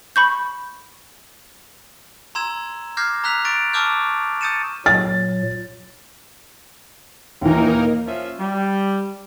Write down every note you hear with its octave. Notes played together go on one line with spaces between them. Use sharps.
B5 C#6 G6
A#5 C6 E6 G#6 E7
D6 F6 G6 G#6 A#6 C7
A#5 E6 F#6 B6 F7
A#5 C#6 A6 D7
A5 C#6 D6 E6 F6 G6
D#6 G6 A6 C#7 D#7 E7
A#2 F#3 A6
D#2 A#2 E3 A#3 D#4 A#4
F3 C#4 F4 E5
G3